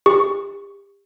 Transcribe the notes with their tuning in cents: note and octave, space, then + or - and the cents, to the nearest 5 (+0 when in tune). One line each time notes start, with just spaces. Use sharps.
G4 +35 C#6 +0